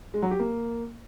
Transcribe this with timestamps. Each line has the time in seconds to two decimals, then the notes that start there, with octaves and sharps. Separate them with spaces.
0.14 G#3
0.22 F#3
0.31 G4
0.39 A#3